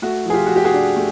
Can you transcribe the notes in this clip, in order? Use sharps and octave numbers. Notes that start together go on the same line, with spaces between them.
A3 F#4
F3 G#4
F4 G4
F3 F#4
G4
F#4 G#4
D4
A3